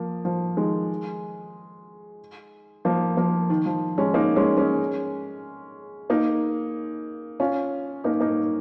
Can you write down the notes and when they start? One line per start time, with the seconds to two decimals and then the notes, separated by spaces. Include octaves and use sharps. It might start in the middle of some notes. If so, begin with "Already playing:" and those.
Already playing: F3 A#3
0.25 F3
0.57 D#3 G#3
2.85 F3 A#3
3.17 F3 A#3
3.50 D#3
3.66 F3
3.98 G#3 C#4
4.14 A#3 D#4
4.36 G#3 C#4
4.57 G#3 C#4
6.10 A#3 D#4
7.40 C#4 F4
8.04 A#3 D#4
8.20 A#3 D#4